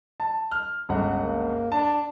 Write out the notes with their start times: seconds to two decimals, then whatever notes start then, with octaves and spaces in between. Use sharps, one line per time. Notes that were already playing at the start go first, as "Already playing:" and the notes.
0.20 A5
0.51 F6
0.89 G1 C#2 F#5
1.20 A#3
1.72 D4 A5